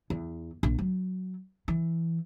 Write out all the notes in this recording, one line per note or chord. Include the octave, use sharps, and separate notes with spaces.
E2
A#1
F#3
E3